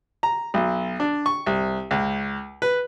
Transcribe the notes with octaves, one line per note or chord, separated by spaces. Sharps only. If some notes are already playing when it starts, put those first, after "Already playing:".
A#5
B1
D4
C#6
C2
C#2
B4